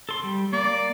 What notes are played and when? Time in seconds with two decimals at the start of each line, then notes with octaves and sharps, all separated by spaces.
0.09 A4 C6
0.23 G3
0.53 A#3 D5